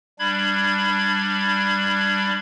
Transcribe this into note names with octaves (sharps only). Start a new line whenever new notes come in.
G3 D4 B5 G#6